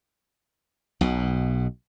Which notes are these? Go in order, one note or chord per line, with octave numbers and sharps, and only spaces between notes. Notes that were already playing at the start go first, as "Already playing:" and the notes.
B1 B2